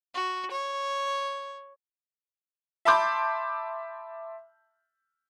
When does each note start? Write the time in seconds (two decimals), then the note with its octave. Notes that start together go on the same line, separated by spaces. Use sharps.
0.14 F#4
0.51 C#5
2.85 E5 A5 B5 C6 D6 G6